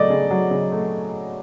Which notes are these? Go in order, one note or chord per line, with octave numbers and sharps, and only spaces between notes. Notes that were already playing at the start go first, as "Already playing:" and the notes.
Already playing: C#3 F#3 A3 D5 D#5
C#3
F#3
C#3
A3